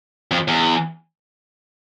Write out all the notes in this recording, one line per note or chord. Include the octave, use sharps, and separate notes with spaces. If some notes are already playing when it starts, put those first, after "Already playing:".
F2
E2